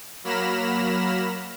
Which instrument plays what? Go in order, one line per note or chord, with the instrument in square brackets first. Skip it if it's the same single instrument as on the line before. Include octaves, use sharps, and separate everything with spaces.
[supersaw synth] F#3 A#3 B5 F6 A#6 E7